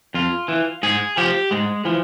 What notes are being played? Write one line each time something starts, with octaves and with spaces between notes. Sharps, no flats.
F2 F4
E3
G#2 G#4
F3 G4
G#2 G#3
E3 F3